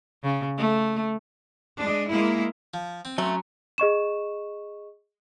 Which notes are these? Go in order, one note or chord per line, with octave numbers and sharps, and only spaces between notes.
C#3
A3
G#3 D4
G#3 A#3 E4
F3
C4
F#3 A3 C#4 A#5 C6
G#4 D#5 C#6 E7